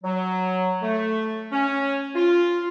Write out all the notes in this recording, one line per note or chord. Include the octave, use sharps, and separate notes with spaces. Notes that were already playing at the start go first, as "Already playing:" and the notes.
F#3
A3
C#4
F4